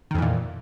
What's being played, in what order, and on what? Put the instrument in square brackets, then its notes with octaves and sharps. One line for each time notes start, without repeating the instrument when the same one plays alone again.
[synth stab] D#3
F2
E3
A#2